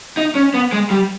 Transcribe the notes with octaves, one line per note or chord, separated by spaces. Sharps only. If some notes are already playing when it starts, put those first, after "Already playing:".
D#4
C#4
B3
G#3
G3